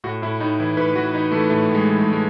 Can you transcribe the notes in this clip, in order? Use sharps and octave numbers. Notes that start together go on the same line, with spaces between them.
A2 F#4
A2 E4
A2 D#4
E3 E4
A2 B4
E3 F#4
E3 D#4
E3 A3
A2 A3
A2
G#3
E3
G#3
A2
G#3